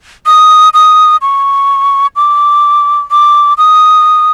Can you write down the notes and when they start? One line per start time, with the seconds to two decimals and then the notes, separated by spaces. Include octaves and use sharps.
0.26 D#6
0.74 D#6
1.22 C#6
2.16 D6
3.11 D6
3.58 D#6